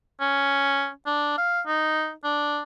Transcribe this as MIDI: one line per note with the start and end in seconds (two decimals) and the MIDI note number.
0.21 0.91 61
1.06 1.34 62
1.38 1.61 77
1.67 2.11 63
2.24 2.63 62